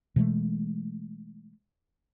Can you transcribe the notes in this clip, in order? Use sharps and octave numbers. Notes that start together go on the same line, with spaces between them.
B2 E3 G#3 A3